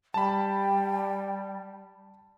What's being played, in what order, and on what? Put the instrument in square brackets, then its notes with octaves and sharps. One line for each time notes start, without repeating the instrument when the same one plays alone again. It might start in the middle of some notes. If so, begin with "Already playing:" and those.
[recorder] G3 [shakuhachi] G5 [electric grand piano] A5 B5